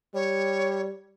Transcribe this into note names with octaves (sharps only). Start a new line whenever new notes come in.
G3 C#5